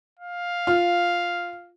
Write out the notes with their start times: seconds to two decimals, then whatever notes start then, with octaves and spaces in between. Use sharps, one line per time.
0.19 F5
0.67 F4